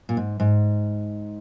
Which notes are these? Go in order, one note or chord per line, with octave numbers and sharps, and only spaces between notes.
A#2
G#2
G#2